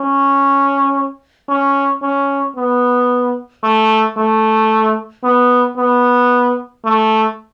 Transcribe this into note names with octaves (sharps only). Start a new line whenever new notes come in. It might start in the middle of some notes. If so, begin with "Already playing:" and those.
Already playing: C#4
C#4
C#4
B3
A3
A3
B3
B3
A3